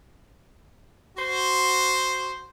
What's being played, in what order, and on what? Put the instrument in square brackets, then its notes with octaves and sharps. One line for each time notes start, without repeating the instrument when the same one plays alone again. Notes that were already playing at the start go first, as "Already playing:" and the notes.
[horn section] F#4 C5